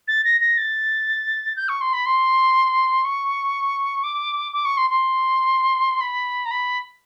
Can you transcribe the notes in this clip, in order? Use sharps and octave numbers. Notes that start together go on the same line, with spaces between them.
A6
A#6
A#6
A6
G6
C#6
C6
B5
C6
C#6
D6
D6
C#6
C6
C6
B5
A#5
B5